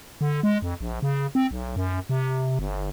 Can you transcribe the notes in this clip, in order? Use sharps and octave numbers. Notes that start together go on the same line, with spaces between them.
D3
G#3
F2
A#1
C#3
C4
B1
F#2
C3
G1